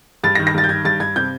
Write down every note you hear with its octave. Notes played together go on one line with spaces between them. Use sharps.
G2 A6
A#6
D#3
A#6
G2 A6
G6
D#3 G#6
G2 A6
G2 G#6
C3 G6